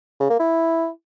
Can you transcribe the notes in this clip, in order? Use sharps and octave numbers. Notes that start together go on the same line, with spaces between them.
C#3
A#3
E4